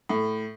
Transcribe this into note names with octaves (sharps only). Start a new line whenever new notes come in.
A2